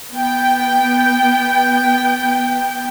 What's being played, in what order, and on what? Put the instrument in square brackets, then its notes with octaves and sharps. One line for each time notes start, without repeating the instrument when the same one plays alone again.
[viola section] B3 G5